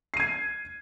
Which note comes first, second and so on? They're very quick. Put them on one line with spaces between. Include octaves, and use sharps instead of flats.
C7 D#7 G#6